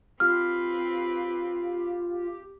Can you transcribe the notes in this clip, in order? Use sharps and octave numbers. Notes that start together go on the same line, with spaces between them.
C4 F4 G4 B4 F6